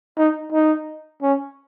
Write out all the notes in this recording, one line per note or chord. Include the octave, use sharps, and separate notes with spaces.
D#4
D#4
C#4